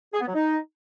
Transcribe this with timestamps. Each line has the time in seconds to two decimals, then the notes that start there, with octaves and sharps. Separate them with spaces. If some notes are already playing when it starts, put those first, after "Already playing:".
0.14 G#4
0.21 B3
0.27 F#3
0.34 D#4